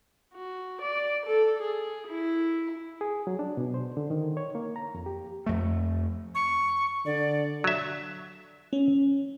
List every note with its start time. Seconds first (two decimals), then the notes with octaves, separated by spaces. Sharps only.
0.35 F#4
0.81 D5
1.26 A4
1.62 G#4
2.08 E4
3.01 G#4
3.27 F#3
3.39 D4
3.57 B2
3.74 C5
3.97 D3
4.10 D#3
4.37 C#5
4.55 A#3
4.76 A#5
4.94 F2
5.06 G4
5.46 F2 A3
6.35 C#6
7.06 D3 D5
7.64 F#3 E5
8.73 C#4